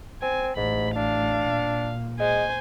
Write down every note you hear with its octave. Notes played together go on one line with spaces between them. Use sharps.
C4 G#5
A1 G#2 B5
D4 F5
A#2
G#3 C5 G#5